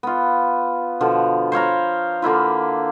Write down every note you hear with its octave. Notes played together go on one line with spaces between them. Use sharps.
B3 F4
B2 D3 F3
C5 C#5 F5 A#5
D3 A#3 E4 F4